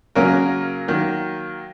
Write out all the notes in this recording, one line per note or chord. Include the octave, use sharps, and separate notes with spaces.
C#3 F#3 A#3 C#4 A#4
D#3 F#3 A#3